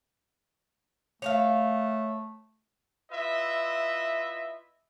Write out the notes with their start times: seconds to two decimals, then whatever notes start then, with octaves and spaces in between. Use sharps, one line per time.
1.22 A3 C#5 D#5 F5
3.11 E4 F4 B4 D#5 E5